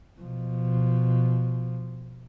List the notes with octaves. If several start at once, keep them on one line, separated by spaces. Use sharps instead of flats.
B2 F3